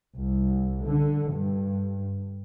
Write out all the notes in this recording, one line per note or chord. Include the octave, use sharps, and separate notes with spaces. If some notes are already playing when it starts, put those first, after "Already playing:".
C2
D3
G2